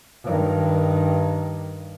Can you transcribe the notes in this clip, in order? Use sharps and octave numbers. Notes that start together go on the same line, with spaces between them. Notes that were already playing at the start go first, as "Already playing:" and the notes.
G2 D#3